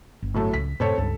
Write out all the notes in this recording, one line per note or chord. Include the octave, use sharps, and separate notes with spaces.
G1
A2 F#3 A3
C#2 B6
F#2 A2 C3 C4 A4 C#5
C#2 G2 A4